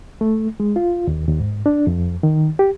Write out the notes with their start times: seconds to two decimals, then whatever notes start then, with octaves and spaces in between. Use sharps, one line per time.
0.21 A3
0.60 G#3
0.76 F4
1.07 D#2
1.27 D#2
1.40 G#2
1.66 D4
1.87 F2
2.23 D#3
2.59 G4